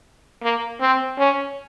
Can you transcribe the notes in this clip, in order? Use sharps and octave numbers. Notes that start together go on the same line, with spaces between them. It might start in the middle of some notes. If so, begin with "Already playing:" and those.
A#3
C4
C#4